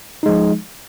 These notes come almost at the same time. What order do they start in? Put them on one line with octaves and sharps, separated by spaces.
D#4 G#3 F3